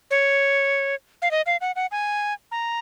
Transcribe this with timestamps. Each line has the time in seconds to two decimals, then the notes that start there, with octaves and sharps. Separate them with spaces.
0.11 C#5
1.22 F5
1.31 D#5
1.46 F5
1.61 F#5
1.76 F#5
1.91 G#5
2.51 A#5